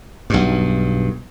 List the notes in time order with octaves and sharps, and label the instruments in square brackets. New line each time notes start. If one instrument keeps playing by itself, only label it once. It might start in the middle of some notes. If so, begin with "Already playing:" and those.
[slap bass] B1 G2